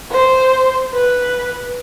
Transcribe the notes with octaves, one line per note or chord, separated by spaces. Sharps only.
C5
B4